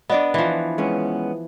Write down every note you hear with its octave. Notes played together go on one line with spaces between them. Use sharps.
B3 D4 D5 D#5
E3 F3
G#3 B3 C#4